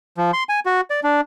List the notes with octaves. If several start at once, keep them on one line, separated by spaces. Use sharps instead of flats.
F3
C6
G#5
F#4
D5
D4